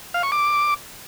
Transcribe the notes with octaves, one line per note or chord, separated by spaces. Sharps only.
F5
C#6
D6